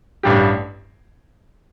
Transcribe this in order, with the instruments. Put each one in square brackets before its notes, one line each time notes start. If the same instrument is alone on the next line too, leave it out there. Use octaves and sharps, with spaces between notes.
[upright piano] A1 G2 G3 D4 G4